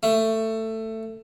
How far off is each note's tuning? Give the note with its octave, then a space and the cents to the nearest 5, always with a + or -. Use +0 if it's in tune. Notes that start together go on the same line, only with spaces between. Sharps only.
A3 +15